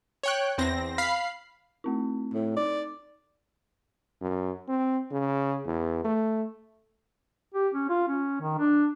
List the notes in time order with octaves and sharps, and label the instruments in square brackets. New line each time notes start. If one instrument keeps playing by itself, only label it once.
[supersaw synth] C#5 G5 F#6
E2 C4 A#6
F5 B5 C7
[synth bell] A3 C4 E4
[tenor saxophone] A2
[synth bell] D#4 [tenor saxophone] D5
[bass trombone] F#2
C4
C#3
E2
A3
[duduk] G4
C#4
F4
C#4
D#3
D4